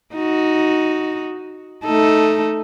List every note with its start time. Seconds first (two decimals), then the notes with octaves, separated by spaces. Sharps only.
0.14 D#4 F#4
1.84 A3 D#4 A4